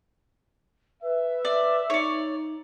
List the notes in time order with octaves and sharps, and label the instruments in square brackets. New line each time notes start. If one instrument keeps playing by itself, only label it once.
[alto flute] B4 [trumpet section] E5
[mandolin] D5
[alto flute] D#4 [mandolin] C#5 D5